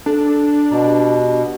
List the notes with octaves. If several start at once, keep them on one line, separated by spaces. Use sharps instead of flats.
D4 A4
B2 A#5
G4